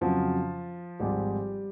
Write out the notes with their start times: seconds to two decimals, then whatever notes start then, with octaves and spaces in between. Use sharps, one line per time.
0.01 F2 C#3 F3 F#3 F4
1.00 G#1 G#2 F3 G3 G#3 G4